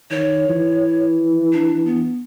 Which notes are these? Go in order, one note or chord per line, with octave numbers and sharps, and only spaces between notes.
D#3 C#5
E3
D4
B3